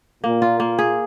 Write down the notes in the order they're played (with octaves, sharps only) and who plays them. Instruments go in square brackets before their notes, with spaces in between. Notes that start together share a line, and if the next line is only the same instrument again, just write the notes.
[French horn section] A#2 [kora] A#3
[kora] F4
A#3
G#4